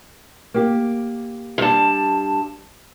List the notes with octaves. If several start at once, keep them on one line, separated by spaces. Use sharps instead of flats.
A#3 G4
G2 A5